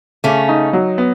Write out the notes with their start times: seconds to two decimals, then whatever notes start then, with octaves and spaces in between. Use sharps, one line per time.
0.24 C#3 A3 C#4
0.49 D#4
0.73 F#3
0.98 B3